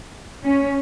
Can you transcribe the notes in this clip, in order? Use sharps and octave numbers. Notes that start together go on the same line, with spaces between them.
C#4